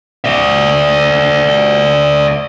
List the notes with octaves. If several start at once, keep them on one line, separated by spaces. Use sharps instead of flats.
D5 E5